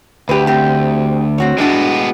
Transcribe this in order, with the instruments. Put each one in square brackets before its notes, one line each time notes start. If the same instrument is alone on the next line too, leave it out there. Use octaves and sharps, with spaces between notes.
[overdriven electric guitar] D2 [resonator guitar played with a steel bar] G4 B4
[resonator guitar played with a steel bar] C4 G4
C4 F#4 C#5
[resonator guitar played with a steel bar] A2 D4 F#4 [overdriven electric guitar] G#3 B3